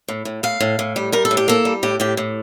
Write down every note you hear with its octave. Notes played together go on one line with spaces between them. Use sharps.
A2
A2
A2 F5
A2
A2
G3
G3 A#4
A4
A2
G4
A#3 A4
G3
A2 G4
A2 G4
A2